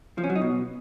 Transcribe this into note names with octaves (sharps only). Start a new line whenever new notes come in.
F3
C#4
F#3
D#4
B2